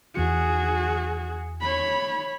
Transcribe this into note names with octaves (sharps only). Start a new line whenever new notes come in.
E2 E3 F#4 G#4 C#7
C#5 B5